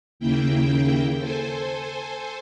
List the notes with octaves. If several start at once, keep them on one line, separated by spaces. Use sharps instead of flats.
D#2 C#3 A#3 E4 G5
A4 C5 G#5